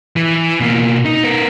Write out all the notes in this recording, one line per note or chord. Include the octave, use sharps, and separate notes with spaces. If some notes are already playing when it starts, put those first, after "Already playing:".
E3
B2 A#3
D#4
B3 A#4